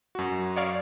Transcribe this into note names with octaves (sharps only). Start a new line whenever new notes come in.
F#2 F#4
C#5 D5 F5